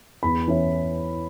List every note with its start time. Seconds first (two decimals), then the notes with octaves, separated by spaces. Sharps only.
0.23 E2 B5
0.48 E3 C#4 E4